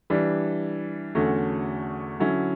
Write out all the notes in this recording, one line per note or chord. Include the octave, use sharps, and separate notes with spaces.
E3 G3 D4
E2 D3 A3 C#4 F#4
D3 F#3 C#4 E4